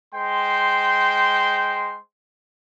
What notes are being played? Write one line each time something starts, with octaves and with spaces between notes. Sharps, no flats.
G#3 C5 G5 C6